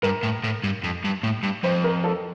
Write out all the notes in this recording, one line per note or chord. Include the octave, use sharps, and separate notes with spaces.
G2 A#4
A2
A2
G2
F2
G2
A2
G2
F2 C5
A#4
A4